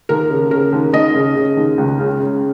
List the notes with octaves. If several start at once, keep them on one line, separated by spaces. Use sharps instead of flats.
D#2 A#4
C#3
C#3 A#4
D#2
D#2 D#5
C#3
C#3
D#2
C#2
C#3
C#3